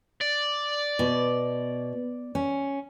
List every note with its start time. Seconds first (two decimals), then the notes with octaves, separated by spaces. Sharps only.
0.21 D5
0.99 B2
2.35 C#4